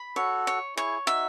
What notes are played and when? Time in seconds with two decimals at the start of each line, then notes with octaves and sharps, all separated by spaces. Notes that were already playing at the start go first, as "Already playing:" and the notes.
Already playing: B5
0.16 F#4 A4 C#5
0.47 C#5
0.76 E4 G#4 C#5
1.06 D#4 F#4 E5